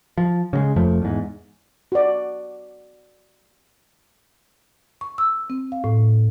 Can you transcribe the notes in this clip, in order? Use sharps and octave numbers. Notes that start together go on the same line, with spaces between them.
F3
C#3 F#3 G#3
F1 F2 F3 A3
E2 G#2
F#4 D5
C#6
E6
C4
F5
A2